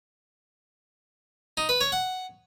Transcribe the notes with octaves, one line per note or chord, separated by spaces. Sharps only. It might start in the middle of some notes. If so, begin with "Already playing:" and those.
D#4
B4
C#5
F#5